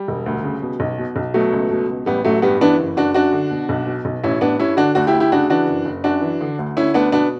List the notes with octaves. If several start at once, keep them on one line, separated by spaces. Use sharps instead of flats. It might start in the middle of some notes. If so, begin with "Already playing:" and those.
Already playing: G3
E1
D2
C#3
B2
B1
B2
B1
B2 F#3 A3
C#2
B2
C#2
A1 G3 B3
A1 F#3 A3
G2 G3 B3
E3 B3 D4
F#1
F#1 D4 F#4
F#2 D4 F#4
D3
B2
B1
B2
B1
A1 C#4 E4
A1 B3 D4
G2 C#4 E4
D3 D4 F#4
D2 D4 F#4
E4 G4
D2
E4 G4
C#3 D4 F#4
E3 D4 F#4
F#1
F#1
F#2 D4 F#4
E3
D3
D2
D3 C#4 E4
D2 B3 D4
B2 B3 D4